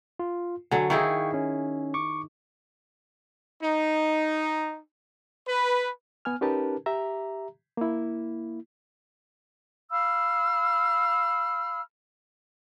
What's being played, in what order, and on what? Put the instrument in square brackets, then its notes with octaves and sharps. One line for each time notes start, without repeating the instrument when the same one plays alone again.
[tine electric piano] F4
[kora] D3 F#3 [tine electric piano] F#4 G#5
[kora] D#3 E4 G#4 [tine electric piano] F5 G5 C#6
[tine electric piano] C#4
C#6 D6
[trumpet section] D#4
B4
[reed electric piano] B3 G#5 F6
C#4 D#4 G4 A#4 B4 A5
G4 E5 A#5
A#3 E4
[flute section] F5 B5 E6 F6